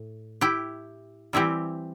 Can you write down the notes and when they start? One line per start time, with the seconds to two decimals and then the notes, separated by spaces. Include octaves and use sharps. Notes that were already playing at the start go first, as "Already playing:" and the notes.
Already playing: A2
0.41 E4 G4
1.33 E3 G3 C4 E4 G4